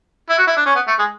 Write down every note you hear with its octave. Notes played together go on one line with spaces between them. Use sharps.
E4
F#4
E4
D4
C#4
B3
A3
G#3